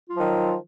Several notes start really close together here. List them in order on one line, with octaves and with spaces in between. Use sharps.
F4 F#3 F3 D#3